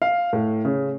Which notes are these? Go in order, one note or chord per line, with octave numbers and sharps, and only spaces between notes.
F5
A2
C#3